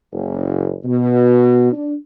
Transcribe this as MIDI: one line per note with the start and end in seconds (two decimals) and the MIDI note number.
0.12 0.74 30
0.84 1.69 47
1.72 1.94 62